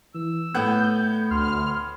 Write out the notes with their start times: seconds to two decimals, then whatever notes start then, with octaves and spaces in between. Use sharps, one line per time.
0.14 E3 E6
0.55 A2 A3 B3 F#6 G6
1.31 D2 C6 F6